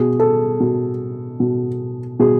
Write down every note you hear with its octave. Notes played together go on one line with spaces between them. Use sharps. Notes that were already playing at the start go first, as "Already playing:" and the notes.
Already playing: B2 G#4
A4
B2
B2
B2 G#4